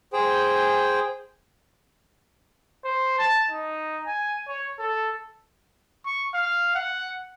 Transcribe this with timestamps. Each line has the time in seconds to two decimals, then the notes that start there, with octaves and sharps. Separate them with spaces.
0.13 G#4 C5 G5
2.84 C5
3.18 A5
3.51 D#4
4.07 G#5
4.48 C#5
4.79 A4
6.06 C#6
6.34 F5
6.75 F#5